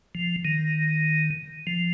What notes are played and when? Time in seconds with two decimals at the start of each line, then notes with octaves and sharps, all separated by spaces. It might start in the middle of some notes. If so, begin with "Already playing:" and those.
0.15 F3
0.45 D#3
1.67 F3